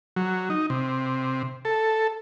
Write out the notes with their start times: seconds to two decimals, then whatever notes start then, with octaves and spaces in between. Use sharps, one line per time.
0.16 F#3
0.50 D#4
0.70 C3
1.65 A4